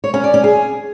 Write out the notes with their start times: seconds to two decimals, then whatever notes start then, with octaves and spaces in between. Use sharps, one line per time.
0.04 C#5
0.14 C#4
0.24 D5
0.34 C#4
0.44 G#4